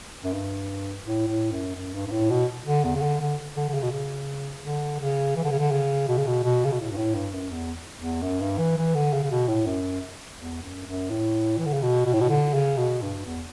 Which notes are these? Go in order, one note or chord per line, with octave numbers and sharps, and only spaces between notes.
F#2
G2
A2
A2
F#2
F#2
G2
G2
A2
B2
D3
E2
C#3
D3
D3
D3
D3
C#3
B2
C#3
D3
C#3
E3
D3
C#3
D3
C#3
B2
C#3
B2
B2
C#3
B2
A2
G2
A2
G2
F#2
E2
E2
F#2
G2
E3
E3
D3
C#3
C#3
B2
A2
F#2
E2
F#2
F#2
A2
E3
D3
C#3
B2
B2
A2
B2
D3
C#3
B2
G2
E2